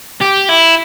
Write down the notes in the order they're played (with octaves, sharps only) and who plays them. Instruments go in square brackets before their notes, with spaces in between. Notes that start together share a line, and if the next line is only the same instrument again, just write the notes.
[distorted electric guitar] G4
E4